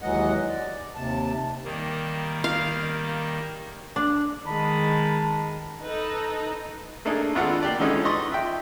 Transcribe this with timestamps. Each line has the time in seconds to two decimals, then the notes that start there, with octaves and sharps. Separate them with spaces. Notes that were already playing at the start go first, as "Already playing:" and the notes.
0.02 D#2 E3 F#3 G#3 D#5 F#5
0.48 D5
0.95 D#2 C3 A5
1.64 D#3 G3 A#3
2.44 F5
3.96 D4
4.47 D#3 G#3 A5 B5
5.82 D#4 A4 B4
7.05 A3 A#3 D4 D#4 G#4
7.35 G#1 B3 D4 F4 A4 F#5
7.63 A#3 G4 D5
7.80 D3 E3 G#3 C#4 D#4 F4
8.04 B4 D5 D#5 C6 C#6
8.30 F4 E5 G5